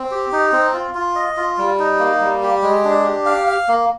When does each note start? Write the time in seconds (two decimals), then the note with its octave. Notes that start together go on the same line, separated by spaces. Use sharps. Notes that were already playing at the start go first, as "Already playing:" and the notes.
Already playing: C4
0.11 G4
0.32 D#4
0.52 C4
0.74 F4
0.95 F4
1.16 D#5
1.37 F4
1.58 G3
1.79 D#4
1.99 A#3
2.21 G3
2.42 G4
2.62 G#3
2.84 D4
3.04 G4
3.26 F5
3.47 F5
3.68 A#3